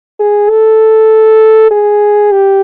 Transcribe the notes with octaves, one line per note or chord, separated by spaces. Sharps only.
G#4
A4
G#4
G4